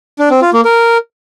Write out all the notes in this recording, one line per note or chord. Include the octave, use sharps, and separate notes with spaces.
D4
C4
F4
A#3
A#4